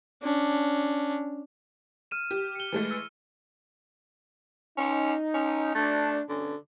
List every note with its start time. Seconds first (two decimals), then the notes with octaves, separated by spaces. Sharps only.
0.23 C#4 D4
2.11 F6 D#7 E7
2.31 G4
2.55 C#7 G7
2.72 E3 G#3 A3
2.91 E6 D#7
4.78 C#4 D#4
5.34 C#4
5.75 A3 D4
6.29 G2 B2 D3 C#4